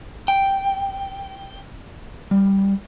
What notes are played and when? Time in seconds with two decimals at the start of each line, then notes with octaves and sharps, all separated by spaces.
0.28 G5
2.31 G3